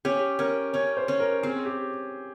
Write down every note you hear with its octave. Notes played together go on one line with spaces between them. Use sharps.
C#4 G4
C#4 A#4
C#4 C#5
C5
C#4
A#4
C4 G#4
G4